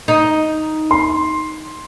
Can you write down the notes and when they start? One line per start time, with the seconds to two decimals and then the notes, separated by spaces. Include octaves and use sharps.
0.08 D#4
0.91 C6